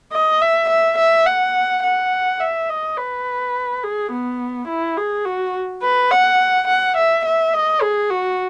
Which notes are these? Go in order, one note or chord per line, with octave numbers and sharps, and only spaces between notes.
D#5
E5
E5
E5
F#5
F#5
E5
D#5
B4
G#4
B3
E4
G#4
F#4
B4
F#5
F#5
E5
E5
D#5
G#4
F#4